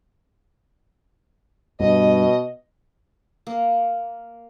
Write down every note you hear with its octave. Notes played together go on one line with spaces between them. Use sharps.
G2 B2 D#5
A#3